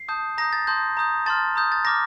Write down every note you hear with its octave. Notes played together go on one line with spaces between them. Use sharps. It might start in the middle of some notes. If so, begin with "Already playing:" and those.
Already playing: C7
A5 D#6 G6
A#5 D#6 G6 A#6
A6
A5 C6 D#6 G6
A#5 D#6 G6
A5 C6 F6 A6
A#5 D#6 G6
A6
A#5 D6 F6 A#6